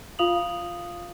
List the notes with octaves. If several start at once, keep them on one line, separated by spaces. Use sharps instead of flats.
F4 F5 D#6 F7 F#7